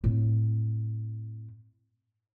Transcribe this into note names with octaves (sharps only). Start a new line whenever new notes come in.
A2 C4